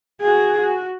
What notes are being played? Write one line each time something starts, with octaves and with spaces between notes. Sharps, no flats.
F#4 G#4
F#4